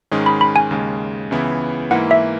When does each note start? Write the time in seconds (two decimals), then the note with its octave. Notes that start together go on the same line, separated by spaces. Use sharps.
0.11 G#2 D#3 G#3 C#4 G#4
0.26 B5
0.41 B5
0.56 G#5
0.71 D#2 C#3 G#3
1.31 C#2 C#3 E3 B3 E4
1.91 G#2 E3 A#3 E4 F#5
2.11 E5